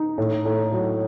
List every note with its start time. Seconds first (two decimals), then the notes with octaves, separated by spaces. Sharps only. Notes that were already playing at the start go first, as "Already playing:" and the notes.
Already playing: D#4
0.18 A2
0.45 A2
0.73 F#3